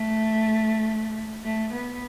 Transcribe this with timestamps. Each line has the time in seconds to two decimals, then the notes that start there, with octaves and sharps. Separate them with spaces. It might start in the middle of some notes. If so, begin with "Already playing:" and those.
Already playing: A3
1.44 A3
1.73 B3